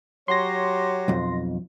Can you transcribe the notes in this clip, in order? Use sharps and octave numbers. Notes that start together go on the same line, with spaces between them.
F#3 G4 C#5 C6 A#6
B1 F2